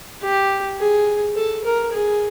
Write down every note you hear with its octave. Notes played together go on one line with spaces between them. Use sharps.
G4
G#4
A4
A#4
G#4